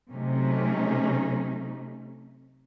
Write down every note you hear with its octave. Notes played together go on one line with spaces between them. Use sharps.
C3 F#3 A3 C#4 D#4